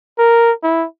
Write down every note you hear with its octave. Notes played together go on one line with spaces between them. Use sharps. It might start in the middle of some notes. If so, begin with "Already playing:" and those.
A#4
E4